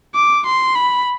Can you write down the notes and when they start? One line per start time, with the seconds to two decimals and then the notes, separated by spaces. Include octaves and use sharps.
0.15 D6
0.46 C6
0.75 B5